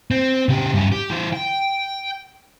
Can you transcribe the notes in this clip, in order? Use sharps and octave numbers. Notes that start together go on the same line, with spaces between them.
C4
C#3 G4
G2 C#4
G4
E3 C5
G5